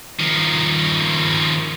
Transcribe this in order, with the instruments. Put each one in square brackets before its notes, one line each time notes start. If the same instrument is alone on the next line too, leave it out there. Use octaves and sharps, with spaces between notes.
[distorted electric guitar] D#3 F3